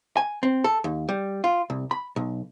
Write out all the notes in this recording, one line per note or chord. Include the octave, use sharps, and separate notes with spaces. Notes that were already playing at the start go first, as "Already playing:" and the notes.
G#5
C4
A4
D#2
G3
F4
C2
B5
B1